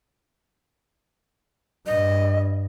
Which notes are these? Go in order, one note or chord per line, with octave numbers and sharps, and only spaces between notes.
G2 D#5